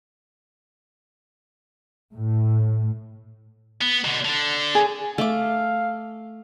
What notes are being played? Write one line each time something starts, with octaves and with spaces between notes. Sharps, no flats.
A2
B3
B2 D3
D3 D4
G#4
A3 F5 D6